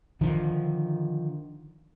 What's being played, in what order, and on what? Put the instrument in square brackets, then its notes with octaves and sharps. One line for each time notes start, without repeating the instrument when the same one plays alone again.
[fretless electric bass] D3 D#3 F3